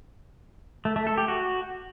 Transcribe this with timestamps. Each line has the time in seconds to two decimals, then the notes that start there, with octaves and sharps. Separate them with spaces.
0.85 A3
0.96 A3
1.07 A4
1.18 G4
1.28 F#4